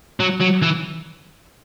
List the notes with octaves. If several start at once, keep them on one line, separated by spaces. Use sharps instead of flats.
F#3
F#3
E3